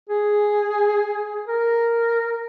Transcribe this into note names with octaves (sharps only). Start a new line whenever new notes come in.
G#4
A#4